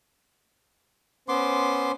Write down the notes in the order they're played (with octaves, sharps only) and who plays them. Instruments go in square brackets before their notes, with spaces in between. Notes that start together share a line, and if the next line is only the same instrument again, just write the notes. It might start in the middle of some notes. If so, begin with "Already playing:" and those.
[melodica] B3 C6 D6 [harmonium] C#4 C5